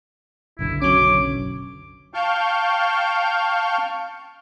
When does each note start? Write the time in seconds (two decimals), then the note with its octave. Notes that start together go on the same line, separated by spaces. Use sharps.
0.59 F#1 B1 D3 E4
0.82 F#3 C#4 D6
2.14 F5 G5 A5 C#6 F6 G6